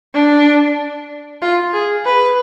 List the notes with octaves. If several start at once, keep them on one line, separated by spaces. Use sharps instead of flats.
D4
F4
G#4
B4